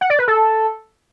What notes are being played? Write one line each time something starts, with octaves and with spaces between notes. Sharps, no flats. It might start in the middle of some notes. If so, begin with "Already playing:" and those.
F#5
D5
B4
A4